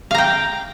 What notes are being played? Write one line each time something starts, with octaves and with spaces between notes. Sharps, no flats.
F5 G5 A#5